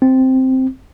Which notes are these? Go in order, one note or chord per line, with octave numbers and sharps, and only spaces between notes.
C4